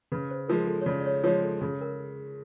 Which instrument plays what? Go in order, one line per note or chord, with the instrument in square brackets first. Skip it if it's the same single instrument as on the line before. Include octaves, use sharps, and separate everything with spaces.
[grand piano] C#3 [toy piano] B4
[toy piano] C5
[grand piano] F3 G#3 [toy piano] A#4
[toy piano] A4
C#5
[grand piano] C#3 [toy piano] D5
[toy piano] D5
C#5
[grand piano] F3 G#3 [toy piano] C#5
[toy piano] A4
[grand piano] C#3 [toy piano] G#4
[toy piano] A#4